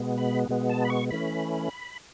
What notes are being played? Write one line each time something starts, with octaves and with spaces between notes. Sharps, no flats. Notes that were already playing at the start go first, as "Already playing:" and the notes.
Already playing: B2 G#3 B3
B5
B2 G#3 B3
A5
B5
C#6
E3 A3 C#4 B5